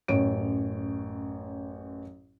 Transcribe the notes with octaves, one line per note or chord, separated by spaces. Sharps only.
A1 F#2 C#5 D7